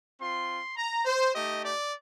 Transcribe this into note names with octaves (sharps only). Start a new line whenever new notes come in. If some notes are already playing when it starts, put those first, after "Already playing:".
C4 F4 C6
A#5
C5
A3 D#4 G4 D#5
D5